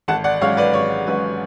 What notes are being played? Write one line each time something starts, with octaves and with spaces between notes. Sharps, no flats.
G#1 F#5 A5
D5 F#5
G#2 F#3 C#4 C#5 F5
B4 D5
G#1 C#5
G#2 F#3 C#4 B4